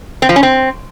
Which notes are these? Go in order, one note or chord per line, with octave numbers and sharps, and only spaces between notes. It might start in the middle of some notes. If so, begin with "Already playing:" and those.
C4
F3
C#4
C4